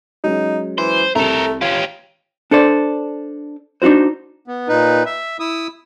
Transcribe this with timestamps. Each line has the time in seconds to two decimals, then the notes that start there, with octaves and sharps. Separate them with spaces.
0.24 F#3 G#3 C#4 D#4
0.78 E3 C5
1.15 C2 C3 A3 A4 A#4
1.61 C#4 F4 G4
2.51 D4 A4 C5 D5
3.82 D4 D#4 F4 F#4 C5
4.47 B3
4.69 A#2 D#4 B4
5.06 E5
5.40 E4 D#6 E6